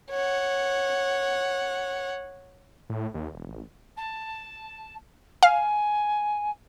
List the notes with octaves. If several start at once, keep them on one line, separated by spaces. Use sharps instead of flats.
C#5 F#5
A2
D#2
E1
A1
A5
F5 G#5